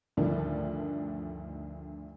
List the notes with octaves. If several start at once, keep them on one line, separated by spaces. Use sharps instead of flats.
D2 G2 D3 D#3 F3 D4